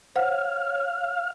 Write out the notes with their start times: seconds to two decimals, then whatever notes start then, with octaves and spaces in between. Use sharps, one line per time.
0.16 C5 C#5 F5 F#5